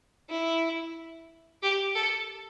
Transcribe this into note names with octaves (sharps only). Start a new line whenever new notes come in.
E4
G4
A4